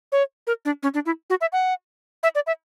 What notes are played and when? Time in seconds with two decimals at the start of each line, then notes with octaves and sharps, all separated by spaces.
0.12 C#5
0.47 A#4
0.65 D4
0.83 C#4
0.94 D4
1.06 E4
1.30 F#4
1.41 E5
1.52 F#5
2.23 E5
2.35 D5
2.47 E5